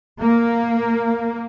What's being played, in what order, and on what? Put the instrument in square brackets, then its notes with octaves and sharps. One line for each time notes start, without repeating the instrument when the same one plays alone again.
[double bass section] A#3